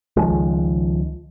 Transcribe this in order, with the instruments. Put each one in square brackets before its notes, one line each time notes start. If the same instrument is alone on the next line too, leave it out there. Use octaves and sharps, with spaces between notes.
[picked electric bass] C#2 D#3 F3 G#3